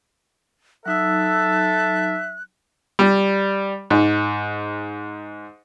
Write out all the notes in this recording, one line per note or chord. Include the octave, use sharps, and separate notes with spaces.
F#3 D#4 A4 E5 E6 F#6
G3
G#2